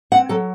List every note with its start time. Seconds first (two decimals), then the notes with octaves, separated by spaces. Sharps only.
0.12 C4 F#5
0.29 F#3 A4